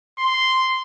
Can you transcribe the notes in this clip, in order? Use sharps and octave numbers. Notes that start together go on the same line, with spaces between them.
C6